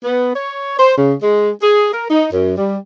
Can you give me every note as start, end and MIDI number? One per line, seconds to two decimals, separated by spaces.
0.04 0.31 59
0.35 0.75 73
0.79 0.96 72
0.97 1.13 49
1.22 1.50 56
1.61 1.90 68
1.91 2.06 70
2.10 2.26 63
2.33 2.53 42
2.57 2.76 55